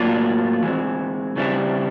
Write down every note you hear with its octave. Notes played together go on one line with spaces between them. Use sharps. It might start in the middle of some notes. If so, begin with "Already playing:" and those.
Already playing: A2 F#3 A#3 D4 F4
E3 G#3 C4
C#3 E3 G3 C4 E4